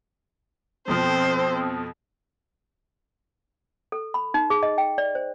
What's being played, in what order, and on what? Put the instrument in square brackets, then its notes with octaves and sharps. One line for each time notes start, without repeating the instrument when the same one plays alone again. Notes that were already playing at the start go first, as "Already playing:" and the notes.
[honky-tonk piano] F2 B2 F3 [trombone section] C4 [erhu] C5
[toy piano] A4
B5
D#4
G#4
D#5
G5
D5
C5